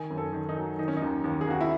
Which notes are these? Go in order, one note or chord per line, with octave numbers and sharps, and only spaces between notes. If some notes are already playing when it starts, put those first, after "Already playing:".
Already playing: D#3 G#5
F#2
A4
D#3
D#4
F#3
D#3 D#4
C#4
D#4
D#2
D#2
G#4
D#2 F#4
E4